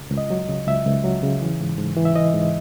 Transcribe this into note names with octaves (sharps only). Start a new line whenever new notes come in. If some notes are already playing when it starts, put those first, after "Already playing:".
Already playing: C#2
C#2
D#5
F#3
C#3
C#2 E5
C#2
F#3
C#3
E3
G#2
G#2
E3
E5
E3 D#5
G#2